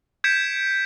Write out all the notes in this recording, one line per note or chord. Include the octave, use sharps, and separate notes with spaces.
G6 G#6 B6 C#7 D7 E7